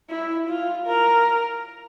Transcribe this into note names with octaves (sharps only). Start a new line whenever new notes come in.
E4
F4
A#4